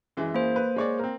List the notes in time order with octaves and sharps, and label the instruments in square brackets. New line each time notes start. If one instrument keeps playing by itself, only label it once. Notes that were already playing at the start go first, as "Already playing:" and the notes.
[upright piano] F#2 E3 G#3
[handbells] A#3 C5
[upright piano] B4
G#3 C#5 D5
C4 A#4